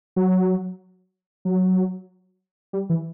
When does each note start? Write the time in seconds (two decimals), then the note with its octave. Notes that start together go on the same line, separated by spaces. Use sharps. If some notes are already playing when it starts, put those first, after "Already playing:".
0.16 F#3
1.45 F#3
2.73 G3
2.90 E3